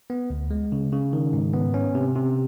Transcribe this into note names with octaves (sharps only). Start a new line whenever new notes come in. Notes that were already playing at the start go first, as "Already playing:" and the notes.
B3
D2
G#3
C#3
C#3
D#3
G#2
B3
C#4
C3
C3